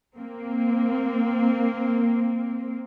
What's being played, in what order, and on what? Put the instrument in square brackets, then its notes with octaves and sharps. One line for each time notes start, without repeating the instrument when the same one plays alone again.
[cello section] A#3 C4